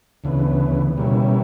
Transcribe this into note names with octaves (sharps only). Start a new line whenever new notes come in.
D2 C#3 E3 B3
B2 G3 A#3 C#4 E4